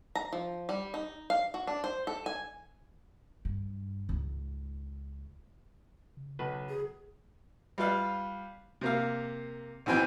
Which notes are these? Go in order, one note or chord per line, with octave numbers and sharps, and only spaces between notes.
A#5
F3
G3
D#4
F5
F#4
D4
C5
A4
G#5
G2
C#2 G#2
C#3
B1 C#3 B4
G#4
G3 F4 B4 F5
C3 A#3 F5
B1 E3 C4 G5 G#5